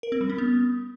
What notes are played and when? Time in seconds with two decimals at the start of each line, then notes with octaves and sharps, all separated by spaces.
0.03 A#4
0.12 C4
0.21 G3
0.30 C#4
0.38 B3